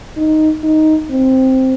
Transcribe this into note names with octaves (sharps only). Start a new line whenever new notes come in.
D#4
D#4
C4